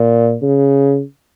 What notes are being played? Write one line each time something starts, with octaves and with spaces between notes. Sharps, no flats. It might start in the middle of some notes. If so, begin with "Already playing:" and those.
Already playing: A#2
C#3